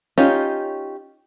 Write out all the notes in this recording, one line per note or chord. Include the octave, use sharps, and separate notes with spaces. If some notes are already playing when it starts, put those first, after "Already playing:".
C#4 D#4 F4 G4